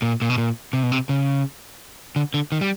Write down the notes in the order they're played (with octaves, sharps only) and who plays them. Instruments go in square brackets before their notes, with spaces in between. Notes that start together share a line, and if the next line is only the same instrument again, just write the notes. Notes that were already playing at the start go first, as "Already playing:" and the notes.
[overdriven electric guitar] A#2
A#2
B2
A#2
C3
B2
C3
C#3
D3
D3
D#3
G3